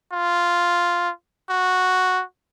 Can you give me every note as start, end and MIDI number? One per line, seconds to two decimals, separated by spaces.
0.12 1.10 65
1.50 2.23 66